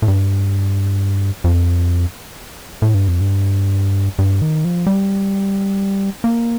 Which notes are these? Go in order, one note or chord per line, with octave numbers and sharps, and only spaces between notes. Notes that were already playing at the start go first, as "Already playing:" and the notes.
A2
G2
F2
A2
G2
F2
G2
G2
D#3
F3
G3
A#3